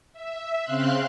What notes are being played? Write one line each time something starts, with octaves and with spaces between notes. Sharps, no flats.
E5
C#3 C4 F5 C6 F#6